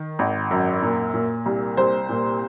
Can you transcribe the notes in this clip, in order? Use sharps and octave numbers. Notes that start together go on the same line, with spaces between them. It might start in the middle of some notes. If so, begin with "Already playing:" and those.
Already playing: D#3
G#1
F#2
A#2
A#2
C2
C2 C5
A#2